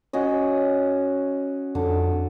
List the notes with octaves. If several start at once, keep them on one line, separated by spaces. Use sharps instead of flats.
C#4 F#4 D#5
F2 D3